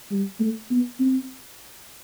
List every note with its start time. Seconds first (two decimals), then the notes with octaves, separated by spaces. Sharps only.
0.11 G3
0.40 A3
0.70 B3
1.00 C4